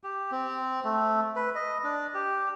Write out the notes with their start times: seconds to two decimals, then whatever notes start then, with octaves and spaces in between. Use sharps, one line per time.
0.04 G4
0.31 C4
0.84 A3
1.36 B4
1.55 D#5
1.84 D4
2.14 G4